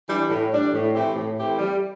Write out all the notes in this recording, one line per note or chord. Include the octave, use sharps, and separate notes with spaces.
E3 G3 D4
A2
E3 G3 D4
A2
E3 A3 C4 G4
A2
E3 A3 C4 G4
G3